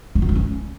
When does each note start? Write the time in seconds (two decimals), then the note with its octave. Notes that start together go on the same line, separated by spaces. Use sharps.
0.15 D4
0.22 F4
0.29 D4
0.35 C#4